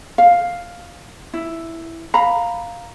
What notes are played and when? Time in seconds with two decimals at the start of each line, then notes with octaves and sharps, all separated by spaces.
0.18 F5
1.34 E4
2.14 F5 A#5 B5